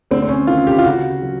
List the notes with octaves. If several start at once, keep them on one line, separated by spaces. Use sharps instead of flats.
D2 C4
C4
C#4
D#3 F4
G4
F4
C#3 F#4
F#3